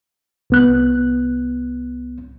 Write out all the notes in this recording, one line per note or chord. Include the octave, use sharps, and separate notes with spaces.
C2 B3 F#6